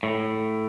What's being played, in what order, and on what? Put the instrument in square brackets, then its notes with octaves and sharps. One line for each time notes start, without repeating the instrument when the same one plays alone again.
[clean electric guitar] A2